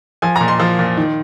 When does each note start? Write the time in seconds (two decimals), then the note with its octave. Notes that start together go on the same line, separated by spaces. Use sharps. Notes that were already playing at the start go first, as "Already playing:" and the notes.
0.22 F3 G#5
0.36 A#5
0.41 A#2
0.48 C6
0.60 F3
0.79 A#2
0.97 D#3